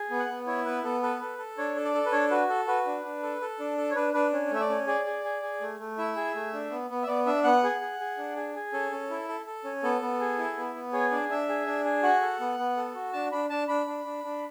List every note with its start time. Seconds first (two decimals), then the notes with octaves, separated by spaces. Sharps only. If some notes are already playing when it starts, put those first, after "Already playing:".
Already playing: G#4
0.10 B3
0.19 F#5
0.29 B3
0.47 E4 C#5
0.65 B3 B4
0.83 B3 A4
1.02 A4 B4
1.21 A4
1.39 A4
1.58 D4 C#5
1.76 A4
1.85 D5
1.95 A4
2.06 B4
2.12 D4 C#5
2.31 F#4 B4
2.49 A4
2.67 F#4 B4
2.86 D4
3.04 D4
3.23 A4
3.41 A4
3.60 D4
3.77 A4
3.91 C#5
3.96 D4 B4
4.14 D4 B4
4.33 C#4
4.51 A3 E5
4.60 D5
4.70 C#4
4.87 G#4 D5
5.06 G#4
5.24 G#4
5.42 G#4
5.61 A3
5.79 A3
5.98 E4 E5
6.16 G#4
6.35 A3
6.53 D4
6.71 B3
6.90 B3
7.03 E5
7.07 B3 D5
7.26 D4 E5
7.44 B3 F#5
7.63 G#4
7.81 G#4
8.00 G#4
8.18 D4
8.36 G#4
8.55 G#4
8.73 C#4 A4
8.92 C#4
9.10 E4
9.28 A4
9.46 A4
9.64 C#4
9.83 B3 A4
10.01 B3
10.20 G#4
10.38 E4
10.57 B3
10.75 B3
10.93 G#4 C#5
11.12 D4 D5
11.29 D4 E5
11.49 G#4
11.67 D4
11.85 G#4
12.03 F#4 F#5
12.21 A4
12.40 B3
12.59 B3
12.77 A4
12.95 F#4
13.13 D4 A5
13.32 D4 B5
13.50 D4 A5
13.68 D4 B5
13.87 D4
14.05 D4
14.24 D4